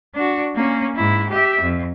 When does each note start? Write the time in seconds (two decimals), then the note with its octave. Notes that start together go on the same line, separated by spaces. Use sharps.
0.15 D4 F#4
0.55 A#3 C#4
0.95 G#2 E4
1.30 G4 E5
1.61 F2